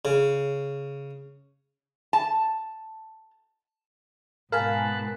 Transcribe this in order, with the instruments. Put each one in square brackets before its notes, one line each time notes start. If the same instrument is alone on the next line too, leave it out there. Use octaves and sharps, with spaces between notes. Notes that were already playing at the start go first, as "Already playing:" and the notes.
[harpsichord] C#3
[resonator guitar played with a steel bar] A5
[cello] G#2 B2 [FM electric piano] A#4 G#5 [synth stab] F5 [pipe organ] A5 B5 F#6